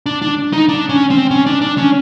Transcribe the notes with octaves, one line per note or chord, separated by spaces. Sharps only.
D4
D4
D#4
D4
C#4
C4
C#4
D4
D4
C#4